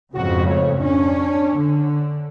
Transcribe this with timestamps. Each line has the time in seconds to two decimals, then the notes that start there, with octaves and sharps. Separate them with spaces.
0.14 F2 G#2 C#3 F#4
0.45 A3 C#5
0.80 C#4 D4
1.57 D3